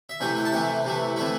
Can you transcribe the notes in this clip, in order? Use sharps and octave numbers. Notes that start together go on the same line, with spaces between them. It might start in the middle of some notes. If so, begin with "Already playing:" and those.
E5
C3 E3 A3 G5
G5
A5
C3 E3 A3 G5
C3 E3 A3
C3 E3 A3 E4